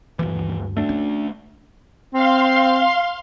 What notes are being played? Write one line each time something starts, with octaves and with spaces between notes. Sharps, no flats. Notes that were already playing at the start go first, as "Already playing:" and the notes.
D#1 D2 G2 E3
A3 D4
C#4
C4 F5 C6